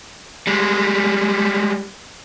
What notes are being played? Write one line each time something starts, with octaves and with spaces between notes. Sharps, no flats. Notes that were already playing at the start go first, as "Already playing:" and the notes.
G3 G#3